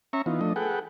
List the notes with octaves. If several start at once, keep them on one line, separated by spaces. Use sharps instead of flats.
C#4 E5 A#5 C#6
E3 B3 D#4 F4
F3 A3 D4 D#5
G#4 A4 B4 F#5 G5